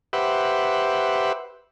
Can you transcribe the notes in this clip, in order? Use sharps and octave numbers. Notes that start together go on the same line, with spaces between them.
G4 B4 C5 E5 F#5